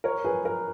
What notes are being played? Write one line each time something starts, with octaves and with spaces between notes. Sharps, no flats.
A#4 C#5
G#4 B4
A#4